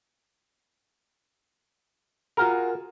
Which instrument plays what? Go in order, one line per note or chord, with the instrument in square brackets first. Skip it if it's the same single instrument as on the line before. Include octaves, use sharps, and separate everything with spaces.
[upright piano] F4 F#4 G#4 [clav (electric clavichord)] A#4